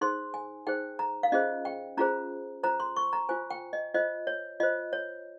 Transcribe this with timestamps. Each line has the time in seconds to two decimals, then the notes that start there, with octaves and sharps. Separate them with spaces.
0.01 D#4 G#4 C5 C6
0.34 G#5
0.67 D#4 G#4 C5 G5
0.99 A#5
1.23 F5
1.32 C#4 F4 G#4 C5 D#5
1.65 G5
1.97 C#4 F4 G#4 C5 A#5
2.63 F4 C5 A#5
2.80 C6
2.96 C#6
3.13 A#5
3.29 F4 C5 G#5
3.50 G5
3.73 D#5
3.94 F4 C5 D#5
4.27 C#5
4.60 F4 C5 D#5
4.93 C#5